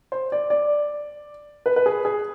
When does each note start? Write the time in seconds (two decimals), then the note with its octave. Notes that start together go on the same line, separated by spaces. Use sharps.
0.12 C5
0.32 D5
0.50 D5
1.66 B4
1.76 B4
1.86 G#4
2.05 G#4